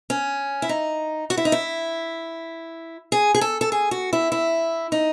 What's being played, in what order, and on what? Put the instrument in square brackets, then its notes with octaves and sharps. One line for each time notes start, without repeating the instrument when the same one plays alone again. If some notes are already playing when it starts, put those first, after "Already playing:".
[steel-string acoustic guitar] C#4
E4
D#4
F#4
E4
D#4
E4
G#4
G#4
A4
A4
G#4
F#4
E4
E4
D#4